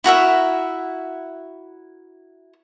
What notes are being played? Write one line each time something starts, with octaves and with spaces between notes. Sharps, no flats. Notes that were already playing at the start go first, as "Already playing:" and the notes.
E4 F#4 A#4 E5